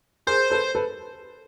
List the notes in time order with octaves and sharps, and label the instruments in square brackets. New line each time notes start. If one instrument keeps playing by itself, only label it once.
[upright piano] G#4 A#4 [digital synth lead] C5
[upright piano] A4 B4
A4 B4